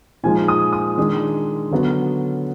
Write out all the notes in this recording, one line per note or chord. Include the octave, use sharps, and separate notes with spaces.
A#2 F3 G#3 D#4 G#5
D#6
D#6
D#3 G#3 D4
D3 F#3 B3